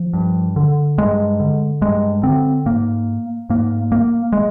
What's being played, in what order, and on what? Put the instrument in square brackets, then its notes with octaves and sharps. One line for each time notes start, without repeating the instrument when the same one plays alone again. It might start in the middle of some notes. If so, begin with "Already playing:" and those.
Already playing: [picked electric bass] F3
G2
D3
G2 G#3
D3
G2 G#3
D3 C4
G#2 A#3
G#2 A#3
A#3
G#3